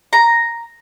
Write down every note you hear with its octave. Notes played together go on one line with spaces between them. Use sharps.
A#5